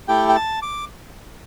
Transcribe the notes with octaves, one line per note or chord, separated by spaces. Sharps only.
A3 E4 G4 G5
G5
A5
D6